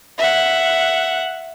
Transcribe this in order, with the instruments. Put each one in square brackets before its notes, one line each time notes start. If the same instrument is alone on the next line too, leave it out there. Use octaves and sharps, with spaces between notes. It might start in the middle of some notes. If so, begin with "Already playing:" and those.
[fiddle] E5 F#5